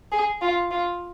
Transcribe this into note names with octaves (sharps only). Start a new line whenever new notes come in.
G#4
F4
F4